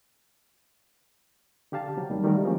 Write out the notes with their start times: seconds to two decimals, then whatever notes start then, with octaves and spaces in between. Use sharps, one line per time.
1.72 D3 G4 F5 A5
1.96 C3 F#3
2.10 D#2 D#3 G3
2.24 D#3 G3 A3 F#4 A#4
2.43 E3 F3 G#3 A#3 C#4